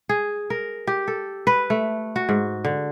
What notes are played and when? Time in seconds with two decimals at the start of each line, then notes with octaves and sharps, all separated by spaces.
0.09 G#4
0.50 A#4
0.87 G4
1.08 A4
1.47 B4
1.70 A3
2.16 F#4
2.29 G#2
2.65 D3